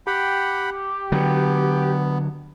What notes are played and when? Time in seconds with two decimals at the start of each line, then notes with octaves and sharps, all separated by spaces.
0.07 G4 F#5 G5 B5
1.12 D3 F#3 B3